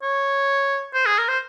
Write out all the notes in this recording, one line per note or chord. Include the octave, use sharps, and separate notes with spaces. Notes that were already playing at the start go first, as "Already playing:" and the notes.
C#5
C5
G#4
A#4
C5